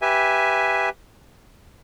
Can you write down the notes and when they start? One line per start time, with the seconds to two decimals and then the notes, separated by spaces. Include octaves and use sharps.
0.02 G4 B4 E5 G#5